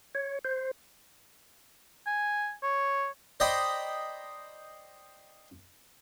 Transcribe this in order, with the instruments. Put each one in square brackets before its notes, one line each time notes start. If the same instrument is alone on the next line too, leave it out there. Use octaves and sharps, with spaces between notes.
[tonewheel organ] C#5
C5
[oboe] G#5
C#5
[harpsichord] C5 D5 D#5 G5 A#5 B5